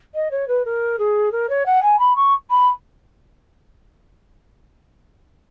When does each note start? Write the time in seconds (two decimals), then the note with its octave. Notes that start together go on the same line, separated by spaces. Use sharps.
0.14 D#5
0.31 C#5
0.47 B4
0.65 A#4
0.98 G#4
1.32 A#4
1.49 C#5
1.65 F#5
1.82 G#5
1.98 B5
2.15 C#6
2.50 B5